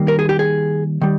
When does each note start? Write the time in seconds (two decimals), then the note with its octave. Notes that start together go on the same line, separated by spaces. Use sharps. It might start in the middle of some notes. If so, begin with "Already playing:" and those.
Already playing: D#3 G3 A#3
0.08 A#4
0.19 G#4
0.29 G4
0.39 G#4
1.02 D#3 G3